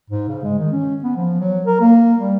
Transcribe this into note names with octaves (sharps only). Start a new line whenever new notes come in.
G#2
C#3
G#3
D#3
C#4
B3
F3
F#3
A#4
A#3
G3